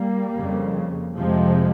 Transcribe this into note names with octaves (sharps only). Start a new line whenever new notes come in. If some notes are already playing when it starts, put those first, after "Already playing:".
Already playing: G3 A#3
F2 C#3
F2 C3 F3 G#3